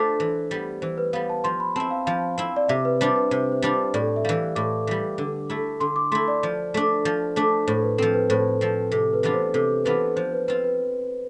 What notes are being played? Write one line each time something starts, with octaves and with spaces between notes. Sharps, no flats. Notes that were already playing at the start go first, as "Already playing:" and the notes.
Already playing: A3 D4 F4 C5
E3
G3 B3
E3 C5
B4
G3 B3 F5
A5
F3 C6
B5
C4 E4 A5
F5
F3 F5
C4 E4
D5
C3 E5
B4
G3 D4 F4 C5
B4
C3 C5
C5
G3 D4 F4
C5
A2 D5
E5
E3 G3 F5
A2 D6
E3 G3
D3
A3 E4
D3 C6
D6
A3 E4 C6
D5
F3
A3 D4
F3
A3 D4
A2 C5
B4
F3 C4 A4
B4
A2 C5
F3 C4
C3 A4
B4
E3 B3 D4 F4
C5
C3 A4
E3 B3 D4 F4 B4
F3 C5
B4
C4 F4 B4
B4